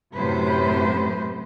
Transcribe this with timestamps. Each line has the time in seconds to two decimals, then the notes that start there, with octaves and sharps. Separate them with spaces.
0.15 F#2 A2 C3 B4 C5